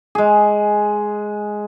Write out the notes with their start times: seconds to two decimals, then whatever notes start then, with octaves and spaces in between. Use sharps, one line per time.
0.15 G#3 G#4